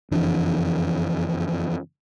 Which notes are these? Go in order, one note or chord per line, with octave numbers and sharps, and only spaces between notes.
F#1 F2 E3 D4